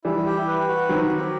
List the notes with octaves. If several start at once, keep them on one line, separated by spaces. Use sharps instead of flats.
E3 G3 E4
G4
B4
F#4
D#3 F#3 C4
G4